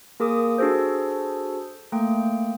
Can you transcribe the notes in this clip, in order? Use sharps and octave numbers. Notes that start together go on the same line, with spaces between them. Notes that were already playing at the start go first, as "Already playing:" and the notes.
A#3 G#4 A#4 D6 D#6
D4 F#4 G#4 A4 C5
A3 A#3 G5